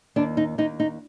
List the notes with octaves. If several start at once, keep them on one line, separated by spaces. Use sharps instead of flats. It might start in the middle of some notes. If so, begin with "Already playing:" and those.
D#2 D4
D#4
D#2 D#4
D#4